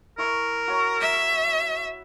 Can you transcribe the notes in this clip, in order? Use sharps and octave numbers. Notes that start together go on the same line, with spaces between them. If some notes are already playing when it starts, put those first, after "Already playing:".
E4 A#4 C#6
F#4 C#5 A#5
E5